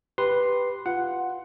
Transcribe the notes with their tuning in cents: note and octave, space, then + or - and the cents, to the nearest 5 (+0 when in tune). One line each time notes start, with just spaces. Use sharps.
G4 +0 B4 +0 C6 +0
F4 +0 F#5 +0